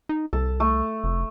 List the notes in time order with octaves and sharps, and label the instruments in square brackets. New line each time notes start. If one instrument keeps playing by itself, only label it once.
[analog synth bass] D#4
[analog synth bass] C2 [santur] A4
[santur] A3
[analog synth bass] F1